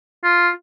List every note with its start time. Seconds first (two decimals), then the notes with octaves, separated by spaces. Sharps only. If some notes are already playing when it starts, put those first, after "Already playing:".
0.24 F4